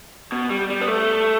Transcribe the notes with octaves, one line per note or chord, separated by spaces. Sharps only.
B2
G3
G3
B3
A3